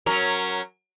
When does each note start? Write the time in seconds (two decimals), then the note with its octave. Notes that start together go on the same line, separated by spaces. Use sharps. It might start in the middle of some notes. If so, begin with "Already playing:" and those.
0.06 F#3 C#4 A#4